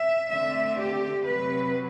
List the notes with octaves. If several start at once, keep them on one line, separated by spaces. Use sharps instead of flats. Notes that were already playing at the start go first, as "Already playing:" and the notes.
Already playing: E5
D3 A3 C4 E5
G4
C3 F#3 C4 B4